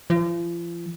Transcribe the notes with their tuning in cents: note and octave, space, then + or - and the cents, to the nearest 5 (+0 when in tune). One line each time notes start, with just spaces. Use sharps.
F3 -40